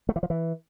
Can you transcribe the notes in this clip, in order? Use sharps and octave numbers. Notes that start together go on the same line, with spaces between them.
A3
E3
F3
E3